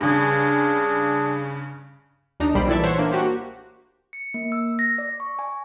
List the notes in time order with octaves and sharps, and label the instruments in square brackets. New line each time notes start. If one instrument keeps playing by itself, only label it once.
[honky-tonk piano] G2 C#3 [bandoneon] D4 [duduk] G#4
[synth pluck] D#2 D4 D#4 A#5
B1 A#2 G3 C5 B5 D7
E3 E4 A4 D5 E5
C5 C#5 E5 F#5 A5 C6
A#3 D4
F#4 G4 C5
[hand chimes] C#7
A#3
E6
A#6
D5
C#6
G#5